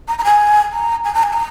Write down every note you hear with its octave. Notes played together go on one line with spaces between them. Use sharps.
A#5
A#5
G#5
A#5
G#5
A#5
G#5
A#5